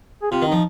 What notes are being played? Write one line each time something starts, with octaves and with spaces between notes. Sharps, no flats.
G#4
C3 F4
D#3
F3 D#4